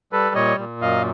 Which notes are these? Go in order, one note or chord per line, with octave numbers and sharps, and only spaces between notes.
G3 A4 B4
A#2 C#5 D#5
A#2
F#2 D#5 F5